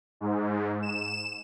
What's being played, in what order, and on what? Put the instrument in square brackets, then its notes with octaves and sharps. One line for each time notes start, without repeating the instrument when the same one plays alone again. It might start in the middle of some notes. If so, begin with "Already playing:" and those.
[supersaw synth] G#2
E7